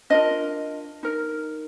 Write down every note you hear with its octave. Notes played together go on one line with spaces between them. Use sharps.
D4 F4 A#4 D#5
D#4 A#4